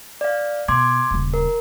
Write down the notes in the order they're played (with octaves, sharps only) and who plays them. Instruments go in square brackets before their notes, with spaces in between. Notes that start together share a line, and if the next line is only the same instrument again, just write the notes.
[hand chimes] D5 F5
[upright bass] B2 [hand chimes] C6 D6 G#6
[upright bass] D#1 C#3
[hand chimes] A#4